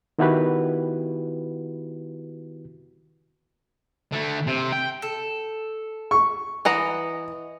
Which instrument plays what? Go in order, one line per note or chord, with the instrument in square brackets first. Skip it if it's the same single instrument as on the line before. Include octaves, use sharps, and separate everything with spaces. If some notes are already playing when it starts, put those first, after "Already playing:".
[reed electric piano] D#3 B3 E4 F#4 G4 B4
[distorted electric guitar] D3 A3
C3
G5
[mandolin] A4
[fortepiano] C#6
[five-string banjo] E3 F#5 A#5 [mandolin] D#5